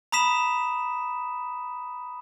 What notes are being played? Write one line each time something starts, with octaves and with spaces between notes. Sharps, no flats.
A#5 B5 D#6 B6 E7